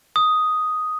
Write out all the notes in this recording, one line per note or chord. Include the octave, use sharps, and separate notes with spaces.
D#6